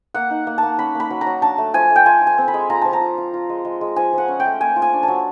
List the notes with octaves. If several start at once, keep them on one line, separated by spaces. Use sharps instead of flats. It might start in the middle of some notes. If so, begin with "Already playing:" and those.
A#3 F#5
D#4
A#3
A5
A#3
C#4 B5
A#3
B5
F#3
A#5
F#3
D4 A5
A3
F3 G#5
A3
G5
F4 G#5
F4
G#5
C4
B5
G#3
F4 A#5
F3 A5
A#5
F4
F4
F4
G#3
G#3
G#3
F3 G#5
F3 F#5
C#4
G5
A3
A#3 G#5
F4
G#5
D4
A5
F#3